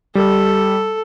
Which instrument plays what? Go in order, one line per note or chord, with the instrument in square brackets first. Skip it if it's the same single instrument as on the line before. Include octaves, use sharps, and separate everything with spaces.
[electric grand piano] G3 [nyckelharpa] A4